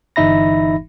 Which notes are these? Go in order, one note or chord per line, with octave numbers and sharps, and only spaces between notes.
G1 E3 D#4 E5 B5 A#6